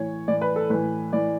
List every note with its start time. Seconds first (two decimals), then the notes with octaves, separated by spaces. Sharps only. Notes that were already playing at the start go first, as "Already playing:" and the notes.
Already playing: A2 E3 C#5
0.28 A2 E3 D5
0.41 B4
0.56 A4
0.70 A2 E3 B4
1.13 A2 E3 D5